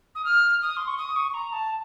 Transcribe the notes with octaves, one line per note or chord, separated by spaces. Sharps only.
D#6
F6
D#6
C6
C#6
D#6
C#6
A#5
A5